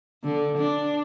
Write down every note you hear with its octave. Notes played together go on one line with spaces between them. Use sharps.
D3
D4